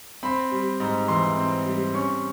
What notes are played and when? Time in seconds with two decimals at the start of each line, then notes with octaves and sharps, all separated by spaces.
0.23 C4 B5
0.51 G3
0.80 G#2
1.08 E3 C6
1.37 C4
1.66 G3
1.94 C#4 C#6